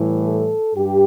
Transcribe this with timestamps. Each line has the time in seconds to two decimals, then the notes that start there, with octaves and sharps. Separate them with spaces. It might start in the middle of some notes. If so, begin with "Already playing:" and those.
Already playing: A2 E3 G3
0.21 A4
0.75 G2 G4